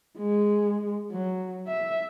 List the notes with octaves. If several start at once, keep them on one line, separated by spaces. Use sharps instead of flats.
G#3
F#3
E5